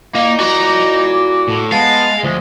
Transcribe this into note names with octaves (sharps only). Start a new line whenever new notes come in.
A#2 A#3 D#4 E4 D6
F#4 A#5
A2
G#3 B3 F5 A5
D2 F3 G#3